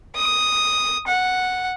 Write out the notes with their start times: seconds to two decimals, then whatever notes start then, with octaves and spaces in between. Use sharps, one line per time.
0.16 D#6
1.07 F#5